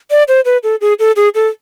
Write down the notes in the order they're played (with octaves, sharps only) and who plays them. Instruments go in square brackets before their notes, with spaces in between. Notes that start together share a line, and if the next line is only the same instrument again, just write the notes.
[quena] D5
C5
B4
A4
G#4
A4
G#4
A4